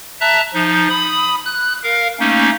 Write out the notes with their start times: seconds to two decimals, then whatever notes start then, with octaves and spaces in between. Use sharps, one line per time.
0.21 E5 A5 A#5 F#6
0.54 F3 D#4
0.90 B5 D#6
1.45 F#6
1.83 A#4 F5
2.19 A3 A#3 C#4 D#4